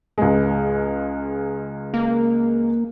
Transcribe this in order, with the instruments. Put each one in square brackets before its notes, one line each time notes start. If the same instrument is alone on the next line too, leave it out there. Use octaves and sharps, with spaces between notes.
[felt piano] C#2 G#3
[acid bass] A#3